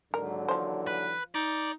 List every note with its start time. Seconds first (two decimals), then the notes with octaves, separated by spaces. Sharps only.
0.14 D#2 G#2 D3 F#3 A#4
0.48 E3 F3 C5
0.87 B4
1.35 D#4 D5